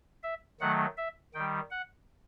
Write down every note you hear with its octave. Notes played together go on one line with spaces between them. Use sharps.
E5
D#3 F#3 A3 F#5
E5
D#3 G3 G5
F#5